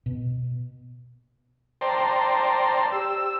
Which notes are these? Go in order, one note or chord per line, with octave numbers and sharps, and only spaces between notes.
B2
C5 D5 G5 A5 A#5 C6
G4 E6